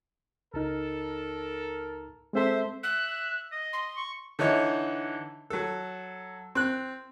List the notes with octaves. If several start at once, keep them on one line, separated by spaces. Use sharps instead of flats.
C#2 D#4 A4 A#4
G#3 C4 A4 C5 E5
E5 F#6
D#5
C6
C#6
D3 E3 D#4 C#5
F#3 A4
C4 F#6